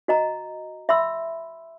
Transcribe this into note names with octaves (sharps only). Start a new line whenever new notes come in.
F#4 D#5 A#5
E5 B5 C6 E6